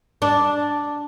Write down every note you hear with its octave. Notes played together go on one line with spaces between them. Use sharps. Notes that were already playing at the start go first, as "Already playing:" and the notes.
D4